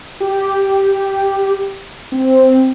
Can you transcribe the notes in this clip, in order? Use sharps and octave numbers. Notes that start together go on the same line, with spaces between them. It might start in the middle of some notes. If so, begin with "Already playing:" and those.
G4
C4